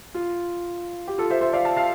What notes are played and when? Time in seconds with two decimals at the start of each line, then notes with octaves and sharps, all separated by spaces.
0.15 F4
1.07 G4
1.18 F4 A4
1.30 C5 E5
1.41 C5 E5
1.53 D5 F5
1.65 F5 A5
1.76 F5 A5